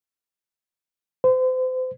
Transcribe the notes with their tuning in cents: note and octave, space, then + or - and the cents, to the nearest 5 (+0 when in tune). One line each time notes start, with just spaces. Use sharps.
C5 -35